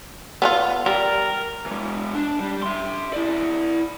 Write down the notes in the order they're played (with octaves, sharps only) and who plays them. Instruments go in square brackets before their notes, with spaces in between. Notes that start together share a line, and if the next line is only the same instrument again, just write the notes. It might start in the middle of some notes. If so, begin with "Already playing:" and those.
[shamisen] B3 C#4 F4
[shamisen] G3 [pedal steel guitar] A#4
[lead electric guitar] E3 G#3
D4
G3
E5 C6
E4 D5